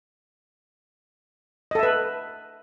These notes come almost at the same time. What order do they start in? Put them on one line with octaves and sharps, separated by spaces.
D#5 A4 E5 B4